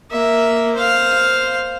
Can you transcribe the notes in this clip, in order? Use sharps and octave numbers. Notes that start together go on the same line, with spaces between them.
A#3 E5
C5 F5